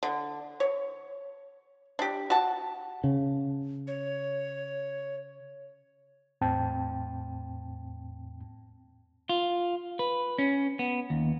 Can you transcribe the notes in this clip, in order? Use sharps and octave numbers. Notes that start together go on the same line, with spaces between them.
D3
C#5
D4 G4
F#4 A5
C#3
C#5
E2 A2 C4 G5 A5
F4
B4
C#4
B3
D#2